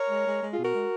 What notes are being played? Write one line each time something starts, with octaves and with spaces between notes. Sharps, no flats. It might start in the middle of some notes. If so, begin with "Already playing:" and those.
Already playing: A#4 C#5
G#3
G#3
G#3
F4 G#4
B2
F#4 A#4
G#3